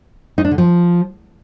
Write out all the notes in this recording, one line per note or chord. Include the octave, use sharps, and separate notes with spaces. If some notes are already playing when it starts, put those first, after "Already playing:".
D#4
D4
D3
F3